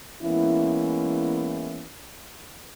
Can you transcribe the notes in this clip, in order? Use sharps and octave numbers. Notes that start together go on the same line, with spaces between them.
E3 G#3 A#3 B3 C#4 E4